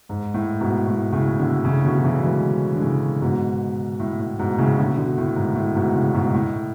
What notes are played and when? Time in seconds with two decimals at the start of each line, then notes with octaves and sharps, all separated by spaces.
0.09 G#2
0.34 A2
0.61 G#2 B2
0.87 A2
1.12 A2 C#3
1.39 B2 D3
1.65 A2 C#3
1.85 B2 D3
1.99 F#3
2.04 C#3 E3
2.23 E3 G#3
2.76 D3
2.82 A2 C#3
3.22 G#2 B2
4.00 A2
4.20 A2
4.39 G#2 B2
4.58 A2 C#3
4.78 B2 D3
4.97 B2 D3
5.17 A2
5.36 G#2
5.55 A2
5.75 G#2 B2
5.95 A2 C#3
6.14 G#2 B2
6.34 A2